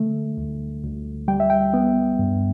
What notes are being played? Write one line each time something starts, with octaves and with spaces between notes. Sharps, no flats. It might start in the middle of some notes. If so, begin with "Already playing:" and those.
Already playing: D3 A3
D2
D2
G3 G5
E5
G5
B3
G2